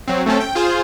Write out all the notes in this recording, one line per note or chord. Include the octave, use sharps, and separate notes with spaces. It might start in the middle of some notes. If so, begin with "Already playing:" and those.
F#3 C4
A3 C4 C#4 A4
G5
F4 G#4 C5